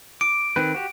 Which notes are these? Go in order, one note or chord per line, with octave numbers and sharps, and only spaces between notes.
D6 D7
D#3 C4 B4
F#4 G4